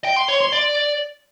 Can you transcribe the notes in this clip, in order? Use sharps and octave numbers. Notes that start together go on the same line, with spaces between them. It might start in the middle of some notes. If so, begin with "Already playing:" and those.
G5
C6
C#5
C6
D5